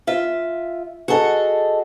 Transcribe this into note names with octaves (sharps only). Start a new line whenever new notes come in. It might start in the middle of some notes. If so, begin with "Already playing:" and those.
F4 E5
F#4 G#4 A4 D#5